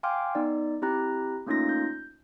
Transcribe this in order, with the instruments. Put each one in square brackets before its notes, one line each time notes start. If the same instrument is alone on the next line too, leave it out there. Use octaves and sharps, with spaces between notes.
[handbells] F5 G5 G#5 C6 D6 F6
B3 D#4 D5
C4 E4 G4 A#5 F#6
A3 A#3 C#4 D#4 F4 A#6
G6